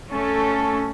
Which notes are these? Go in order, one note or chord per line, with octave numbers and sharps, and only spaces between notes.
A3 C#4 A4